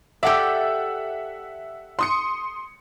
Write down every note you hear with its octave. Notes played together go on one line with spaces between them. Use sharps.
G4 A4 D5 E5 F#5 E6
C6 D#6 C#7